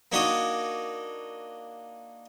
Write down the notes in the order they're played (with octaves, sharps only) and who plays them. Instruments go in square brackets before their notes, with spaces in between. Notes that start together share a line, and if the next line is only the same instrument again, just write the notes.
[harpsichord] A#3 D4 D#4 F#4 C#5 D#5